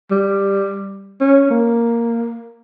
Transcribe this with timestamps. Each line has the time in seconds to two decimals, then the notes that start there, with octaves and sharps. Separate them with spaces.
0.11 G3
1.20 C#4
1.50 A#3